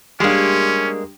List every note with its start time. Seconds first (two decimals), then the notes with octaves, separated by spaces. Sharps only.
0.20 G3 G#3 A#3 C#4 D4 G4